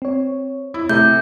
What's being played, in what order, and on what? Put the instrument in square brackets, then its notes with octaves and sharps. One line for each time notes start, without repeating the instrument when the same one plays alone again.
[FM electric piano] C4 C#5
[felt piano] E4
[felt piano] C3 [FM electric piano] A3 A4 [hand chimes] G6